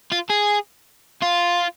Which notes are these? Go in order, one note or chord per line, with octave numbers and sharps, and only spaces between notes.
F4
G#4
F4